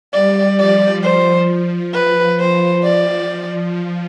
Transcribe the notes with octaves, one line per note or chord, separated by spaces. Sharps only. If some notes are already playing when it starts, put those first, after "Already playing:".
G3 D5
F3 D5
C5
B4
F3 C5
D5
F3